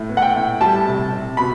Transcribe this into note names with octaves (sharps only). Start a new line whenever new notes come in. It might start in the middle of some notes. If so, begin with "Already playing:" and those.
Already playing: A2
B3
F#5
G5
A2
G3 A5
C3
C3
B2 B5